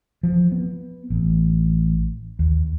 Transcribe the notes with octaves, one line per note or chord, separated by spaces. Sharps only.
F3
B3
A1
D#2